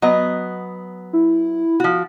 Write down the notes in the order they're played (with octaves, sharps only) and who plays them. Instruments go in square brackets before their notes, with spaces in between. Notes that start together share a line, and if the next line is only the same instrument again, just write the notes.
[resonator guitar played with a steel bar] F#3 B3 D#5
[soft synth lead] E4
[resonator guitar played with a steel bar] F3 F#4